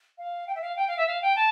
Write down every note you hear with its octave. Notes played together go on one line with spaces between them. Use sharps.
F5
G5
E5
F5
G5
F5
E5
F5
G5
A5